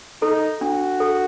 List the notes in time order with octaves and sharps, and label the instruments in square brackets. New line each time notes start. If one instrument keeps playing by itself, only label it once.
[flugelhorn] D#4 [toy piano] A4
[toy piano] D4 [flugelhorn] F#4
[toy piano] A4